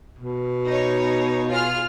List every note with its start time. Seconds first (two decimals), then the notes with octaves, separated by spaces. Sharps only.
0.19 B2
0.67 D#4 C#5
1.49 F4 G#4 F6